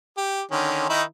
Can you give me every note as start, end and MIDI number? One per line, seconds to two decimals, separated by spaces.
0.17 0.42 67
0.51 0.86 50
0.51 0.86 51
0.51 0.86 61
0.89 1.03 51
0.89 1.03 63
0.89 1.03 64